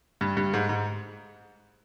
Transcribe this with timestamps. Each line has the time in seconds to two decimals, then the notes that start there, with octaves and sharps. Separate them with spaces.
0.21 G2
0.37 G2
0.53 G#2
0.69 G#2